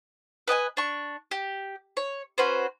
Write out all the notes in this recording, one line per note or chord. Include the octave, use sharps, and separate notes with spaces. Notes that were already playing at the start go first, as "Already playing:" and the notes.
B4 D#5 G5 G#5
D4 C#6
G4
C#5
C#4 F#4 B4 C5